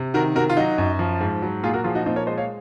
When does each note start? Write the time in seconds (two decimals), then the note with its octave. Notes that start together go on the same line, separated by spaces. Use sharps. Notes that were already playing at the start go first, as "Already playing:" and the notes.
Already playing: C3
0.14 D#3 F#4 A#4
0.36 C3 F#4 A#4
0.50 F4
0.57 F#3 D#4 F#4
0.78 F#2
0.99 F3
1.21 G#2
1.42 F#3
1.63 A#2 F4 G#4
1.74 F#4 A#4
1.84 F3 F4 G#4
1.95 D#4 F#4
2.06 A#2 C4 D#4
2.16 A#4 C#5
2.27 G#3 C5 D#5
2.38 C#5 F5